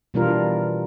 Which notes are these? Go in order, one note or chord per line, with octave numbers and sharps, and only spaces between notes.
B2 E3 G3 D4 F4 A#4